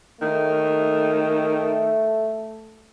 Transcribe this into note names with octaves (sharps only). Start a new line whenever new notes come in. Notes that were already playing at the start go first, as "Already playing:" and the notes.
D#3 A3